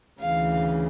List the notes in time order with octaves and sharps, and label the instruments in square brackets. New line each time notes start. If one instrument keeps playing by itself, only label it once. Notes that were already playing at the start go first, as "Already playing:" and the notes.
[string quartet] D2 C#3 E3 F5